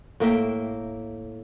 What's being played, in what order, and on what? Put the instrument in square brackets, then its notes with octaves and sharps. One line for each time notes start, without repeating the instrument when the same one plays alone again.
[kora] A2 A#3 E5 G5